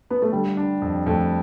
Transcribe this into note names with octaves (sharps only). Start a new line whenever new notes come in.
B3
A3
D3 G3
D4
F2
F2 A3